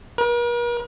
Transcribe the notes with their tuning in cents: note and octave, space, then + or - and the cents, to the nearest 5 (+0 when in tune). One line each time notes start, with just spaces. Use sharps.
A#4 +45